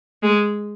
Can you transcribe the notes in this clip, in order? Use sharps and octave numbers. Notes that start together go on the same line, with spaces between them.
G#3